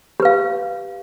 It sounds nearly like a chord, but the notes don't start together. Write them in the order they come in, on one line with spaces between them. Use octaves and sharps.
G4 B4 F5